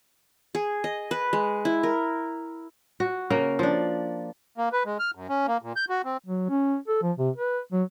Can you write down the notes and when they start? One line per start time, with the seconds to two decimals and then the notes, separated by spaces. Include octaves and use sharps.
0.55 G#4
0.84 D#5
1.11 B4
1.33 G#3
1.65 E4
1.83 A#4
3.00 F#4
3.30 C#3 A#3 A#4
3.59 F3 D4
4.58 A#3
4.72 B4
4.85 G#3
4.99 F6
5.15 F#2
5.29 C#4
5.47 A#3
5.62 A#2
5.76 G6
5.89 F#4
6.05 C4
6.26 F#3
6.49 C#4
6.88 A4
7.02 F3
7.18 C3
7.36 B4
7.72 F#3